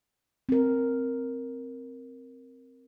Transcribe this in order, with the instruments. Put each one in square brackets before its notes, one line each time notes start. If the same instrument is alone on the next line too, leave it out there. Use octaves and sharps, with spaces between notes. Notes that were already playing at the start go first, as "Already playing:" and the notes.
[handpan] C4 A#4